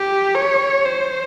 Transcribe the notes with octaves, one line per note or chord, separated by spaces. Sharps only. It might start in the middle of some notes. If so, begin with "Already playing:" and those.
Already playing: G4
C#5
C5